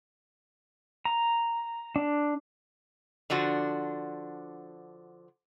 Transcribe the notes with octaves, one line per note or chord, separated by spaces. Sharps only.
A#5
D4
D3 F3 D4 F#4